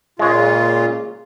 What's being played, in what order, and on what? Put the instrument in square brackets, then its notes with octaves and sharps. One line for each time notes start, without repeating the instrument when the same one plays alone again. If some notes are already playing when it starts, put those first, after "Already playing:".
[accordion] A#2 C#3 F4 [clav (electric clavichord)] G#3 C#5